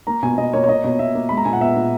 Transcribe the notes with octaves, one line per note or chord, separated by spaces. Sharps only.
A#3 A#5
B2 G#5
B2 D#5
A#3 C#5
C#5
A#3 D#5
B2 C#5
B2 E5
A#3
G#3 B5
A#5
A#2 G#5
F#5
B3 E5
A#2